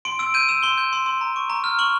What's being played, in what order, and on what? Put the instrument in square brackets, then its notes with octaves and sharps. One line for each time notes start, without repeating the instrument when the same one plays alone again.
[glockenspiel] C6 D7
E6 D7
G6 D#7
E6 E7
C6 G7
G6
C6
C6
A#5
C#6
A#5
F6
C#6 F#7